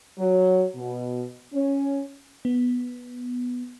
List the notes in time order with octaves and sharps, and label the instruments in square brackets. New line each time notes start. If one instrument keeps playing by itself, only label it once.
[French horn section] F#3
B2
C#4
[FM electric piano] B3